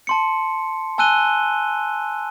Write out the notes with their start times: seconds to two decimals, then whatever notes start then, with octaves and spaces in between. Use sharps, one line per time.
0.07 A5 C6 C#7
0.98 G#5 A5 E6 F#6 D#7 G7